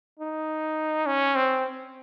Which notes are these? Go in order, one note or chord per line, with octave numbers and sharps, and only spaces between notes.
D#4
C#4
C4